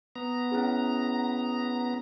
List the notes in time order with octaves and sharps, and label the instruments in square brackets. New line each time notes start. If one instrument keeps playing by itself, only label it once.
[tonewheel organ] B3 A#5
[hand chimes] C#4 E4 G#4